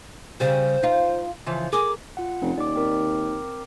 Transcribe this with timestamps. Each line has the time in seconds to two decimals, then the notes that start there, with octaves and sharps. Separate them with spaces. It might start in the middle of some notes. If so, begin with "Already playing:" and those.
0.40 C#3 G3 C5
0.83 D#4 F4
1.46 C#3 E3 F3
1.73 G#4 A#4 D6
2.17 F4 F#5
2.42 F1 C#4
2.58 D#2 D5 D6
2.76 C4 A#4 D6